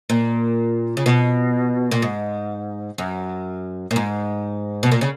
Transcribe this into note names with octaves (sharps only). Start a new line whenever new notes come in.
A#2
C#3
B2
A#2
G#2
F#2
A#2
G#2
B2
A#2
C#3